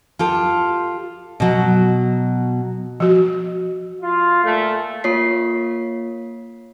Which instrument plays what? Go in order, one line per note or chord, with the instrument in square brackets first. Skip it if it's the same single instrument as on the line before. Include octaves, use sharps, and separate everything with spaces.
[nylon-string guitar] F4 G4 A4
B2 F#3
[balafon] F3 F#4
[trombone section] F4
A#2 A3
[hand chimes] A#3 F4 C#5 B6 C7